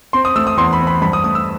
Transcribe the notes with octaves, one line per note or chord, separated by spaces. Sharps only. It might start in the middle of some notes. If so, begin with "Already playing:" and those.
C4 C6
D#6
A3 E6
D#6
E2 C6
B5
C4
B5
G2 B5
D#6
A3 D#6
E6